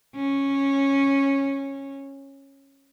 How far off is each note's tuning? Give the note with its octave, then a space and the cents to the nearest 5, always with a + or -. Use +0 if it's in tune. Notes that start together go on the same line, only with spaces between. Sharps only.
C#4 -10